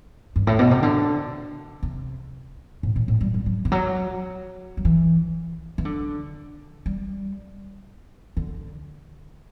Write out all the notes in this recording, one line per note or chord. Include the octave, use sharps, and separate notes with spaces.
G2
A2
B2
C3
D3
C3
A2
A2
A2
G3
G3
F#3
E3
F#3
F#3
E3
E3
D3
G3
D3